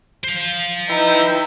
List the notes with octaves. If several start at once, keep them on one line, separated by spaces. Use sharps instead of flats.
C5 F5
D#4 E4 B4 G5